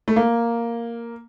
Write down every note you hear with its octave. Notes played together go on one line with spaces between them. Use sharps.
A3
A#3